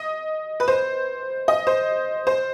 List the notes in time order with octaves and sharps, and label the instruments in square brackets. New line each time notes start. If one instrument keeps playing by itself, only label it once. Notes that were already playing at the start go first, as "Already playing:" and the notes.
Already playing: [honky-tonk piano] D#5
B4
C5
D#5
C5
C5